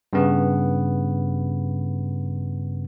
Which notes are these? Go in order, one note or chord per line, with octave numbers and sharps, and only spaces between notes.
G2 C#3 B3